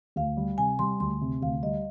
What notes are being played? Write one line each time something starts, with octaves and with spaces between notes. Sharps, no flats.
D2 F5
G3
C3 G#5
G3 C6
D2 C6
C3
D2 F5
G3 D#5